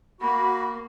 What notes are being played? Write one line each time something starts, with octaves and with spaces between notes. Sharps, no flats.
A#3 F#4 B5